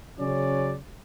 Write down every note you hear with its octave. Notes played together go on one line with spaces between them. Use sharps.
C#3 F#3 C#4 D5